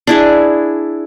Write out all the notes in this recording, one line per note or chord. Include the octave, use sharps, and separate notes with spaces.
D4 E4 G#4